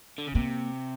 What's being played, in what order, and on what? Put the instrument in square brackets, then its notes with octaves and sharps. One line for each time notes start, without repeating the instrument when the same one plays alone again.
[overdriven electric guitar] D3
C#3
[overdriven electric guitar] C3 [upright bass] A#3